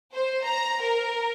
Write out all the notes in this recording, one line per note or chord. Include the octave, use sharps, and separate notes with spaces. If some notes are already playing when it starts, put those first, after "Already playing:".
C5
A#5
A#4